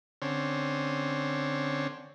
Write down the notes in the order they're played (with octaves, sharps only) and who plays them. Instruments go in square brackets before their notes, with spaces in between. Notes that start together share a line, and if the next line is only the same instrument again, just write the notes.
[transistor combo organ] D3 C4 C#4